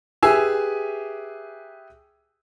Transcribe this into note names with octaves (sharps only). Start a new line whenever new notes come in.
G4 G#4 B4 E5 G#5 E6